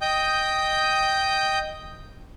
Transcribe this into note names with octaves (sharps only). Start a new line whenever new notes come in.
D#5 G5 D#6 G6